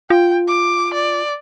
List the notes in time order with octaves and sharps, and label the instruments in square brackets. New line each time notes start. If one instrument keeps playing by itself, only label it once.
[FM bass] F4 [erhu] G5
[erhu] D6
D5